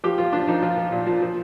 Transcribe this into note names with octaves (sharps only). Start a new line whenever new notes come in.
F3 G4
F3 F4
F3 D4
F3 D#4
F3 F4
F3
A#2
F3
F3